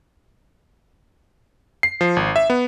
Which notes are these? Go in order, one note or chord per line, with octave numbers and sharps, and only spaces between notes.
C7
F3
G#1
E5
B3